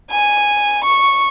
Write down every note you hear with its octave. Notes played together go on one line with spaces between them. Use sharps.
G#5
C#6